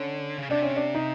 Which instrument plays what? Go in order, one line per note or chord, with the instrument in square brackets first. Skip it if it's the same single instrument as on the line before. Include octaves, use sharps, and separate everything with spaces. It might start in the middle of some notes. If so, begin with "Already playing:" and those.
Already playing: [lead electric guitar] D3 [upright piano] C#4
[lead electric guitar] C#3
[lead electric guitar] C3 [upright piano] D4
[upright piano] C#4
D4
D#4